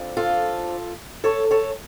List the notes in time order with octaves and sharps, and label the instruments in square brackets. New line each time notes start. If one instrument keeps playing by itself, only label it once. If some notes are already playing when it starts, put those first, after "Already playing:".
Already playing: [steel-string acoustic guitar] F2 D3 F3
F4 A4
A4 C#5
A4 C#5